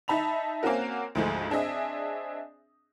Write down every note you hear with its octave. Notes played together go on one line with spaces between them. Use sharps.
D#4 E5 A5 B5 F7
A#3 C4 C#4 F#4 A#4
D2 G#2 F3 G#3 A3
C4 D4 G#4 D#5 E5